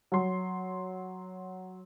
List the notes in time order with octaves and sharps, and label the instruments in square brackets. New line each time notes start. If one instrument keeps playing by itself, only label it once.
[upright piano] F#3 C6